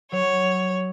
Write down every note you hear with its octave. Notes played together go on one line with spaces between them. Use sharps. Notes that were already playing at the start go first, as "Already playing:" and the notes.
F#3 C#5